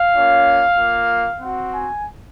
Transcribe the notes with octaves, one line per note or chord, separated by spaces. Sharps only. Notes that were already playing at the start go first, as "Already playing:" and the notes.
Already playing: F5
A#3 C#4 F4
A#3 F4
C4 F#4 F#5
G#5